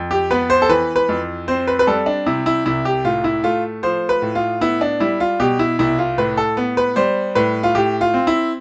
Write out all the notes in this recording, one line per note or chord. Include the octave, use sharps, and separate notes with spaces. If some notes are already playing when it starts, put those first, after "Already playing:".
Already playing: F2
G4
B3 B4
C5
A4
E3 B4
B4
F2
C4 C5
B4
B4
G3 A4
D4
C3 E4
E4
C2 E4
G4
A2 F4
E4
A3 F4
F3 C5
B4
A2
F4
B3 E4
D4
G3 E4
F4
B2 G4
E4
C2 E4
F4
A2 B4
A4
B3
B4
G3 C5
A2 B4
F4
A2 G4
F4
C4
E4